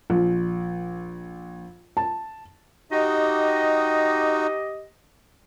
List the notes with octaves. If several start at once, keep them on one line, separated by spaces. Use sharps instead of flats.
A#1
A5
D#4 F#4 G4 D#5